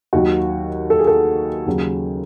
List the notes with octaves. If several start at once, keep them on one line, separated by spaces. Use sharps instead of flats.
D#2 D#3 F#3 F#4
A4
G#4
A4
D#2 C#3 F#3